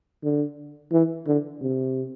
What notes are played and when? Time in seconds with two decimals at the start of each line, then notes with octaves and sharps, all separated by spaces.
0.23 D3
0.92 E3
1.27 D3
1.61 C3